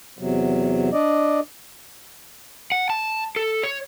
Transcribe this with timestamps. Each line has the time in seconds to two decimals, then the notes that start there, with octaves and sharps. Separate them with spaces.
0.19 E2 C3 F#3
0.92 D4 D5 D#5
2.72 F#5
2.90 A5
3.36 A4
3.63 C#5